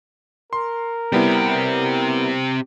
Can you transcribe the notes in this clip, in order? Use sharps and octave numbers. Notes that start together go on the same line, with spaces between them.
A#4 C6
G3 B3 C4 E4 G4